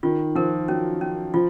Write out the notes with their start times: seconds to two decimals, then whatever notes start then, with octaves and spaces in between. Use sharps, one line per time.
0.03 D#3 F4
0.35 F3 A#4
0.68 F#3 C#4
1.01 C#4
1.34 F3 F4